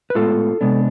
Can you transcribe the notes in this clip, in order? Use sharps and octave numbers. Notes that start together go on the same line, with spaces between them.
B4
A2 G#3 B3 F4 A4
C3 G#3 B3 D4